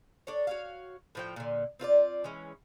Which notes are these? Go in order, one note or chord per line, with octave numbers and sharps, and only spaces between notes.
D4 A4 C#5
F#4 C#5 F5
A2 F3 G5
A#2 D3
C4 F4 B4 D5
E3 G#3 C#4